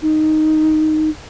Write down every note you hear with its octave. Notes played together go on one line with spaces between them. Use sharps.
D#4